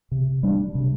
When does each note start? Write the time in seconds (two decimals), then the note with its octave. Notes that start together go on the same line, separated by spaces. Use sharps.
0.12 C3
0.43 G3 D4
0.75 C3